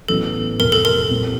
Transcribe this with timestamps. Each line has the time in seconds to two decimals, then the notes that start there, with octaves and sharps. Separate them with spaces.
0.08 A1 A2 F#3 B3 A4
0.60 F1 F2 C3 A#4
0.72 A4
0.85 A#4
1.10 C2 A#2 G3 C4